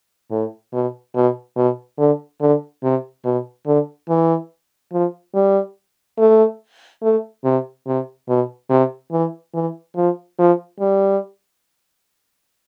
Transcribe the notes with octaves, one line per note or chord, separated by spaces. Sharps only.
A2
B2
B2
B2
D3
D3
C3
B2
D3
E3
F3
G3
A3
A3
C3
C3
B2
C3
E3
E3
F3
F3
G3